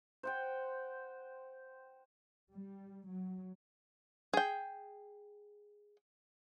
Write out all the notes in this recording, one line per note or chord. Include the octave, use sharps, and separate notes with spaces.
C5 F#5 G5
G3
F#3
G#4 G5